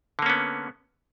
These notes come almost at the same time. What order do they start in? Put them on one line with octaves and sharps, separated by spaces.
D3 A#3 C#4 B3